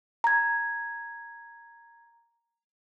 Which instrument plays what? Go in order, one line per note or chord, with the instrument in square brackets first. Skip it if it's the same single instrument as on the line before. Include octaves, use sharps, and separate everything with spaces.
[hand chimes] A#5 G#6